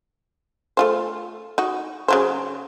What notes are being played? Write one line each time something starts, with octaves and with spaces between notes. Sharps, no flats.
A3 F4 C5
D#4 F#4
C#3 F#3 C5